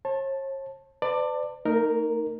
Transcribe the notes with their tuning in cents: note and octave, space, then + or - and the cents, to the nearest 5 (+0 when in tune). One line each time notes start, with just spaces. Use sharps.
C#5 -45 A5 +0
B4 +45 D5 +15 A5 +30
A3 +45 D#4 +0 A#4 +0